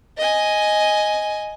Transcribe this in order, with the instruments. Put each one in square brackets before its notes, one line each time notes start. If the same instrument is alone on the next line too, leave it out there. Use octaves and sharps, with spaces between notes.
[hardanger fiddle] D#5 G#5